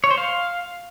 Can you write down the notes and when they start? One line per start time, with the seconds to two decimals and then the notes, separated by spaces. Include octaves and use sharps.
0.04 C#5
0.11 C5
0.18 F5